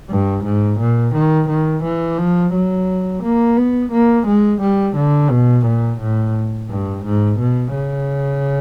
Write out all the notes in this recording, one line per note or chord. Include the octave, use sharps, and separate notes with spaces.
G2
G#2
A#2
D#3
D#3
E3
F3
F#3
A#3
B3
A#3
G#3
G3
D3
B2
A#2
A2
G2
G#2
B2
C#3